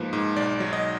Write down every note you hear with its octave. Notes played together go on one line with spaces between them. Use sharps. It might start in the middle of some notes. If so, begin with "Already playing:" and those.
Already playing: G#2 F3 A#3 B4
G#2
B1 D5
F#3
D#5